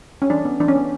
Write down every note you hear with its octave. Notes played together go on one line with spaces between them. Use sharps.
C#4
E3 D4
B3
E3 D4
C#4
B3